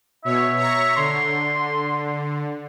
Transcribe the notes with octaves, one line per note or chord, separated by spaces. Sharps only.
B2 C#5 E5
C#5 A#5 C#6
D3 C6